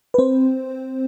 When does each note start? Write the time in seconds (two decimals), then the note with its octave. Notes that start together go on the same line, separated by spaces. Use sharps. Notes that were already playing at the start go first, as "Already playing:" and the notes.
0.14 B4
0.18 C4 C5